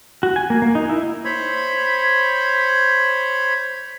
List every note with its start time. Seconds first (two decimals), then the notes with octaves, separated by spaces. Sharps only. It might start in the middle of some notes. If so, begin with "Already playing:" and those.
0.23 F#4
0.36 G#5
0.50 A#3
0.62 A#3
0.75 D#4
0.89 E4
1.25 C5 C#5 B5